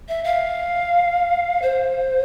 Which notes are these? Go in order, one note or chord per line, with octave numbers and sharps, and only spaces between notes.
E5
F5
C5